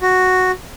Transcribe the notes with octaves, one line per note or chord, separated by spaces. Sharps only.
F#4